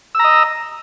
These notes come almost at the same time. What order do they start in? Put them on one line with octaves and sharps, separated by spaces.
E6 A#5 D#5